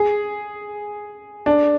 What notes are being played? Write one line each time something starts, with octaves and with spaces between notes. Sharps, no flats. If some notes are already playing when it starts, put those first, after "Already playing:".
Already playing: G#4
D4